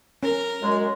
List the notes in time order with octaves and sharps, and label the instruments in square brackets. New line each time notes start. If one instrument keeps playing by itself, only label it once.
[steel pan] C#4 [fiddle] A#4
[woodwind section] F#2 G#3